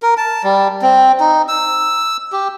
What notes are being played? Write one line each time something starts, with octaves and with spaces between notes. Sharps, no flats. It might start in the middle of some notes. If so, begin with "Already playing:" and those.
A#4
A5
G3
C4
D#4
E6
G4